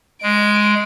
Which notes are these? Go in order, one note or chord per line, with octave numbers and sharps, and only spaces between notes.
G#3 D7